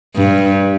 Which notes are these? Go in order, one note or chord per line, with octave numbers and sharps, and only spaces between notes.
G2